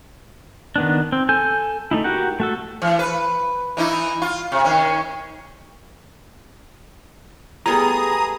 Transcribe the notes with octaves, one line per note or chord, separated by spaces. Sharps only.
D#3 B3 D4
C4
A4 G#5 G6
A3 D#4 E4
F#4 G4 A#4 F#5
A3 F#4 A4
E3
B4
E3 D#4 E4
F4
C3
D#3 C#4
G3 A3 B3 G#4 A#5 D#6